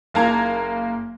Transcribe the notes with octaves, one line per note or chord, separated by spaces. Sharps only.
F#1 A#3 A5 A#5 G#6